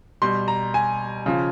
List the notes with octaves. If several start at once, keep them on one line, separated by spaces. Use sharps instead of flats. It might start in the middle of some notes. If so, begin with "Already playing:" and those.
B2 G3 C6
A#5
G#5
C#3 F3